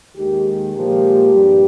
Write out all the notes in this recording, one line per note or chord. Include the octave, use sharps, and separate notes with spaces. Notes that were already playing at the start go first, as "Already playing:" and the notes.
D#2 D#3 G#3 G4
A#2 F3 G#3 G4
G2 G3